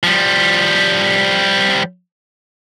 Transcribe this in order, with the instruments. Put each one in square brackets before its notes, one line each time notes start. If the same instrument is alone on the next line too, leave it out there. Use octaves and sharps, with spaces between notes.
[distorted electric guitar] F3 G3